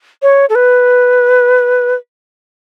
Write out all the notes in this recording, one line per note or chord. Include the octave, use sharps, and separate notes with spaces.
C#5
A4
B4